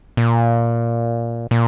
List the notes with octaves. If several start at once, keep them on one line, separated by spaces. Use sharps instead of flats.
A#2
A#2